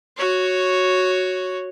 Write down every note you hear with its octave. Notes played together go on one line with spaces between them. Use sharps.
F#4 C#5